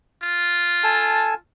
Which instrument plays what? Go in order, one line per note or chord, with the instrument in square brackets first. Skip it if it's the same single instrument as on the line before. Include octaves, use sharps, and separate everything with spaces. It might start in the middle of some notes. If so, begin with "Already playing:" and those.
[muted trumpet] F4
[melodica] A4 G#5 A5